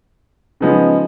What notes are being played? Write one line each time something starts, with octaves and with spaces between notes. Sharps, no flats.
C#3 F3 G#3 B3 D#4